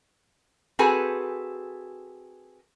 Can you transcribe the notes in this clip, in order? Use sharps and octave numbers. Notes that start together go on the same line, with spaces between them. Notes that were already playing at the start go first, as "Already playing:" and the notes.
C4 F#4 G#4 A4 B4 G#5